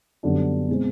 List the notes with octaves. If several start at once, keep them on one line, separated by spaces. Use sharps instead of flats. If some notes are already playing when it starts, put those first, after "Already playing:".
F#2 D3 G3 B3 D4
B2 G#3 C4